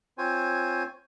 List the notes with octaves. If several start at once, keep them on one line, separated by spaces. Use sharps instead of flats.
C4 F4 C5 C#5 G#5